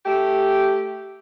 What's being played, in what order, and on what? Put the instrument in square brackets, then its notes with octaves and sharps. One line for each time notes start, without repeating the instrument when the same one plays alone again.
[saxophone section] A3 G4